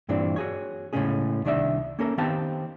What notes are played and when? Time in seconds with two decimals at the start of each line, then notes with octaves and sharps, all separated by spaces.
0.09 G2 A#2 E3 C4 D4
0.36 F#4 G#4 C#5
0.93 A2 C#3 E3 G#3 C#4 G#4
1.45 C2 D#3 D4 D5 E5
1.99 A#3 C#4 A4 A#4
2.18 D#3 B3 C4 G4 F5 A5